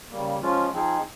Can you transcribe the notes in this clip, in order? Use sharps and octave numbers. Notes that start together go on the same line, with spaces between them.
C#3 G3 A#3
F3 G#3 C#4 F4
F3 C4 D#4 G#4